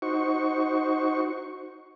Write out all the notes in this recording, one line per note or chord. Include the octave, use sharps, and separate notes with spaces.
D#4 F#4 C5 C#6